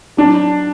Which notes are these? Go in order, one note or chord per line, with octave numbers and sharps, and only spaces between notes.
F#3 D4